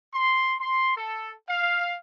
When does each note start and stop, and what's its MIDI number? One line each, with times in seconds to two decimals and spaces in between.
0.13 0.54 84
0.60 0.95 84
0.97 1.33 69
1.49 1.95 77